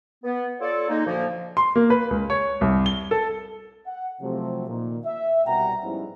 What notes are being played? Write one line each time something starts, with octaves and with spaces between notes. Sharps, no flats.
B3
F4 A4 C#5 D5
G#3 A#3 D#4
D2 A#2 F3 A#3
C6
A#3
B4
C#2
C#5
C2
G7
A4
F#5
C3 F3 F#3 A3
A#2 D#3
E5
C2 B2 G3 F#5 G5 A#5
G#2 F3 G3 B3 C#4 E4